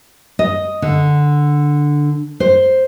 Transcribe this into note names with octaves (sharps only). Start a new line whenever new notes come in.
D#5
D3
C5